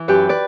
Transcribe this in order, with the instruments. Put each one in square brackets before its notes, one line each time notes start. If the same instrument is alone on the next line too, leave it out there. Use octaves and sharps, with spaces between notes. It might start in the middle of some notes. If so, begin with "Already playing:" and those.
Already playing: [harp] E3
F#2 G4 B4
B4 D5